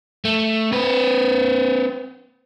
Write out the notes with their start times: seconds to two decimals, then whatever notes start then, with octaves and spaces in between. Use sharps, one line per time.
0.25 A3
0.73 C4 B4